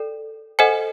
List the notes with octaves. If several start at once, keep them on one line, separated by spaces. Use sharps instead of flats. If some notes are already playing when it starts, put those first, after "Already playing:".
Already playing: A4 D5 G5
A4 C5 D#5 F#5 G#5